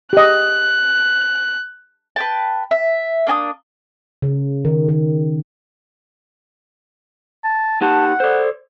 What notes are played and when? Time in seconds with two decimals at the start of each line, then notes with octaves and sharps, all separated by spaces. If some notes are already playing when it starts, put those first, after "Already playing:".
0.13 G4 D#5 F#6
2.16 B4 G5 A5
2.71 E5
3.27 A#3 D4 G#5 D#6
4.22 C#3
4.65 D#3
4.89 D#3
7.44 A5
7.82 D#4 G4 F#5 A5
8.20 A4 C5 D5